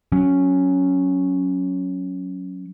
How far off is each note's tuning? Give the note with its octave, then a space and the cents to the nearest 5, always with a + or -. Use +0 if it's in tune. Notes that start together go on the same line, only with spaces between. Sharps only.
F#3 -5 C#4 +0